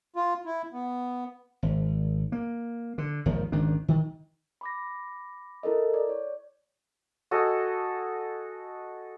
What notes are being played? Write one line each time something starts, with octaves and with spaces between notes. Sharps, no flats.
F4
E4
B3
G#1
A#3
D3
G#1 D#2 D#3 F3
G#1 C#2 D#3 D4
D#3
B5 D6 A#6
E4 A4 A#4 D#5
D5
C#5
F#4 A4 D#5 G#5